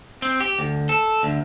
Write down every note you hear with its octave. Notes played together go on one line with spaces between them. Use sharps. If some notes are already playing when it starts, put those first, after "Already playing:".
C4
G4
D2
A4
D2